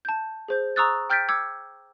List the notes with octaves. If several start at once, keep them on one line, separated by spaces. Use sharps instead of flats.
A5 G6
G#4 C5 G6
A#5 C#6 D#6 E6 F#6 A6
G5 F6 G6 A6 B6 D7
D6 E6 G#6 C#7